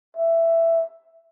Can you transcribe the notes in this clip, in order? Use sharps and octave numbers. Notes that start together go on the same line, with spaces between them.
E5